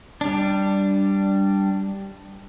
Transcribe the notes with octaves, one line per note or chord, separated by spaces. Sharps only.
G3 D4